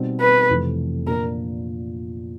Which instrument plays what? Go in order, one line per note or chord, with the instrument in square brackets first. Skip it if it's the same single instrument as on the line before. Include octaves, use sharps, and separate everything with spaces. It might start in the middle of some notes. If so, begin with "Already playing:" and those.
Already playing: [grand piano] B2 G3 C4 D#4
[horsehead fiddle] B4
[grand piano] F2 C3 E3 A3
[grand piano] A#2 F3 A#3 D4 [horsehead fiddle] A#4